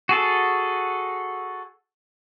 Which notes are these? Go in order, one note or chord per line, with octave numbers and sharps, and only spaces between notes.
F#4 G#4 A4